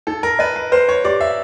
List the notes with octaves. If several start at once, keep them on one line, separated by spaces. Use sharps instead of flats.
D#4 A4
A#4
B4 D#5
B4
B4 C5
C#5
G4 D5
E5